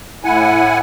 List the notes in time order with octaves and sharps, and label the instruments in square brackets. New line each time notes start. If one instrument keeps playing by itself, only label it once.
[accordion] A2 E4 F#5 G#5